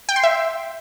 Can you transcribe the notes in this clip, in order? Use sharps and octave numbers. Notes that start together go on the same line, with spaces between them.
G5
C6
E5